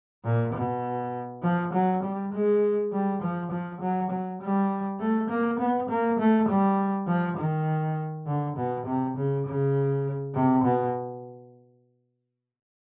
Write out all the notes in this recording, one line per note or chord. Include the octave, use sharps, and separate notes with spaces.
A#2
B2
F3
F#3
G3
G#3
G3
F3
F3
F#3
F#3
G3
A3
A#3
B3
A#3
A3
G3
F3
D#3
D3
B2
C3
C#3
C#3
C3
B2